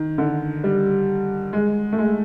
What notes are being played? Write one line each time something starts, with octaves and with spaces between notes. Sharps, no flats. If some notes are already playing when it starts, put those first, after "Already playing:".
Already playing: D#3
D3
G3
G#3
A3
G#3